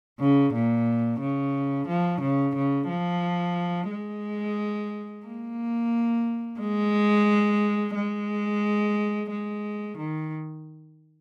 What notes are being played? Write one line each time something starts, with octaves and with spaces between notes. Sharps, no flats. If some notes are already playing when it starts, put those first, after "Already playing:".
C#3
A#2
C#3
F3
C#3
C#3
F3
G#3
A#3
G#3
G#3
G#3
D#3